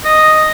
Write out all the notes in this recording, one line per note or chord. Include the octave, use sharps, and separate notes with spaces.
D#5